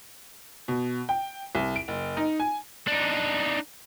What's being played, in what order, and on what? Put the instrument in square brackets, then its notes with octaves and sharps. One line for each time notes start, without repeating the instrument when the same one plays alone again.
[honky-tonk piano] B2
G5
C2
D7
F#1
D#4
G#5
[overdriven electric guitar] D4 D#4